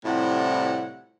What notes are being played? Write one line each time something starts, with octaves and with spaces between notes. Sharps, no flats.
A2 C3 F3 G3 E4 F#5